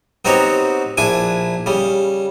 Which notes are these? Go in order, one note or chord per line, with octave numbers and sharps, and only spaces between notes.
B3 C4 D#4 F#4 G4 C#5
A#1 D4 E4 G#5
C#3 G3